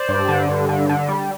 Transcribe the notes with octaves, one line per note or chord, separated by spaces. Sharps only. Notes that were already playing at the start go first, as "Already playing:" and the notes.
Already playing: C5 D5
G2
D3
G2
D3
D3
G3